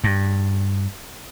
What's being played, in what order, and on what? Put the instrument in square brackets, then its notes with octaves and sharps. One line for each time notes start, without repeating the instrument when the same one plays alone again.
[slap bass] G2